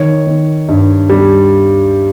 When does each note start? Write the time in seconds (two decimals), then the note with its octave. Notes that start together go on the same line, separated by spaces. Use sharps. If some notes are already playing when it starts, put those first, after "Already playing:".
Already playing: D#3 C#5
0.27 D#3
0.69 G2
1.10 G3